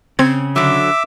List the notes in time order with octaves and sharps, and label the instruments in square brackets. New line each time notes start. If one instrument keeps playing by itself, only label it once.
[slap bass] C#3 [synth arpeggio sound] C4 G#6
[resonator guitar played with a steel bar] D3 F#3 [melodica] E5 D6 E6